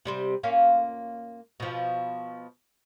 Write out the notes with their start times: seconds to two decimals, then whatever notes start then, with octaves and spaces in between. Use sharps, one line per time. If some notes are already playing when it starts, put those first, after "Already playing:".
0.05 C3 G3 C4
0.43 A#3 C#4 F4
1.60 B2 F3